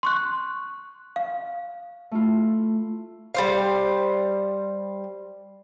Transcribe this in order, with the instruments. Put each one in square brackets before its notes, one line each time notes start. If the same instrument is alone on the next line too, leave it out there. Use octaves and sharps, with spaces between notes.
[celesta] C6 C#6 F#6
F5
[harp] A3 E4 F4
[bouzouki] G3 C5 F5